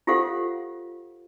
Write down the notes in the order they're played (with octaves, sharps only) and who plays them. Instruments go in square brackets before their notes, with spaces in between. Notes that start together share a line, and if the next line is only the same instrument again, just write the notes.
[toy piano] F4 G4 A4 C5 F5 F#5